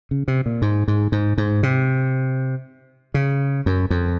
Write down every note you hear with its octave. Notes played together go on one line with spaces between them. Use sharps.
C#3
C3
A#2
G#2
G#2
G#2
G#2
C3
C#3
F#2
F2